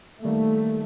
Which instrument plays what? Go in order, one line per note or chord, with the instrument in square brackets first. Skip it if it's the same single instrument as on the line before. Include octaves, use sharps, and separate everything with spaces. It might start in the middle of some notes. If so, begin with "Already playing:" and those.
[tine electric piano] D#3 G3 A#3 D#4 [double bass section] A3